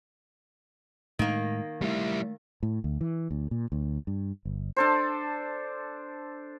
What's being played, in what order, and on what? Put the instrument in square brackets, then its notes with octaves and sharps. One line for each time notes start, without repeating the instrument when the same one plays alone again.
[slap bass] A2 G#3 [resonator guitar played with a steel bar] D#3 A#3
[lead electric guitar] G3 E4 [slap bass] A3
[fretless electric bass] A2
D2
E3
D2
A#2
D2
G2
G1
[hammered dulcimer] D4 A4 C5